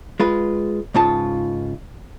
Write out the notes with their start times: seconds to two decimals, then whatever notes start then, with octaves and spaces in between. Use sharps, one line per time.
0.20 G#3 F4 B4
0.94 C#2 G#2 C#3 F4 A5